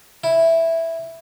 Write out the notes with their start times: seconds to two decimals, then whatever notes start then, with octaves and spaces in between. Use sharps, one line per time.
0.24 E4